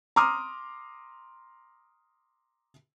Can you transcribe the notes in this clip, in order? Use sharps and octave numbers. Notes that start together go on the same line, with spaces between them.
A#5 C6 D6 D#6 F6